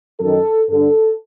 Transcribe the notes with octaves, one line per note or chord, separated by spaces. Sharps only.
F#2 D#3 A4
G2 D3 A4